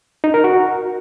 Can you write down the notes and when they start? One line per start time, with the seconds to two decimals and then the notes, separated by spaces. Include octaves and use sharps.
0.24 D#4
0.34 A#4
0.44 F#4